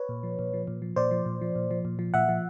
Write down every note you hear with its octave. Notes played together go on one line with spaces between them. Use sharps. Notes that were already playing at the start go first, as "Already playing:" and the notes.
Already playing: B4 C#5
A#2
F3
A#2
F3
A#2
F3
A#2 C5 D5
F3
A#2
F3
A#2
F3
A#2
F3
A#2 E5 F#5
F3